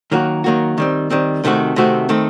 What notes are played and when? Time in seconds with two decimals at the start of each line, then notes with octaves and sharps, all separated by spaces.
0.12 D#3 F#3 A#3 F#4
0.44 D#3 F#3 A#3 F#4
0.78 D#3 G3 C4
1.10 D#3 G3 C4
1.44 C3 D#3 A3 C4 F#4
1.76 C3 D#3 A3 C4 F#4
2.09 D#3 A3 C4